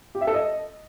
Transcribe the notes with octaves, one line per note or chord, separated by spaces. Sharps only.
G4
E5
A4
D#5